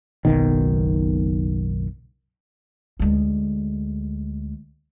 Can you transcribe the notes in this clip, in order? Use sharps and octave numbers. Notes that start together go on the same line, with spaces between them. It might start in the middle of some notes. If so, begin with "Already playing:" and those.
F#1 B1 B2 D#3
D2 G#3